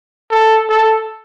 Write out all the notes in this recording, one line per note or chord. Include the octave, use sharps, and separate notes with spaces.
A4
A4